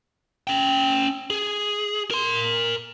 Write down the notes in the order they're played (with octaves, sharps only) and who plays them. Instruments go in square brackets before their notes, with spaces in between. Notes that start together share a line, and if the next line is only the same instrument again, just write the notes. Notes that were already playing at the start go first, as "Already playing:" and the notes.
[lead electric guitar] C#4 G5
G#4
A#4 C6